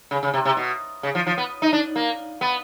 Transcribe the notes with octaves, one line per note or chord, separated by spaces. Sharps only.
C#3
C#3
C3
C3
B2
C#3
F3
F3
B3
D#4
D4
A#3
B3